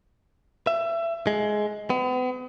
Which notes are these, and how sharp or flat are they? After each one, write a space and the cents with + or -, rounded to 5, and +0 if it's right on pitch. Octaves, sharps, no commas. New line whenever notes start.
E5 +25
G#3 +15
B3 +40